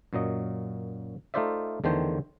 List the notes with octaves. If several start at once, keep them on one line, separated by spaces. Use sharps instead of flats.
F#2 A#2 F#3 D#5
A3 D#4 F4 C5 D5 E5
E2 D3 D#3 A3 C5 G5